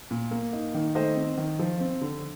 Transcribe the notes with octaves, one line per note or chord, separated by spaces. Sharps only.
A#2
A#3
D#4
D#3
A3 C5 D#5
C4
D#3
F3
C4
D3